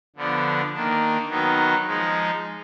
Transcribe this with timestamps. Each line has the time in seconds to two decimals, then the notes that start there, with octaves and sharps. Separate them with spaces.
0.16 D3 F3 B3 D4
0.73 D#3 A#3 D4
1.29 D#3 F#3 B3 D#4
1.86 F3 G#3 D#4